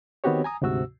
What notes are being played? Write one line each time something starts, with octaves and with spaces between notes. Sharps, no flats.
D#3 B3 C4 F#4 G4 C#5
G#5 A#5 D#6
D2 G#2 C3 F#4 E6